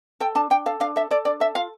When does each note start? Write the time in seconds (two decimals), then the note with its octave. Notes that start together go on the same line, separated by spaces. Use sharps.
0.20 A4 G5
0.35 D4 A5
0.50 D4 G5
0.66 A4 F5
0.80 D4 F5
0.96 A4 E5
1.11 A4 D5
1.25 D4 D5
1.40 A4 E5
1.55 F4 F5